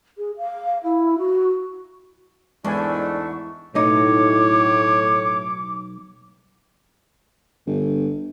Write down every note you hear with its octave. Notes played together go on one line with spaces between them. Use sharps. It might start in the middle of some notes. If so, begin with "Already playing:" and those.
G#4
F5
E4
F#4
E2 G#2 G#3 A3 D4 G#5 C#6
B1 A2 D#4 C#5 D6
G1